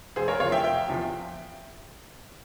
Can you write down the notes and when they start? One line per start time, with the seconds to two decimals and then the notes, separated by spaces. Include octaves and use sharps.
0.16 F1 G#4 C5
0.28 A#4 C#5
0.40 E2 C3 F3 C#5 F5
0.52 E5 G5
0.64 F1 E5 G5
0.88 E2 C3 F3